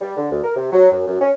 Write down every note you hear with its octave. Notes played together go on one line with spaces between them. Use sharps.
G3
D3
D2
A#4
C3
F#3
F#2
F#2
C#4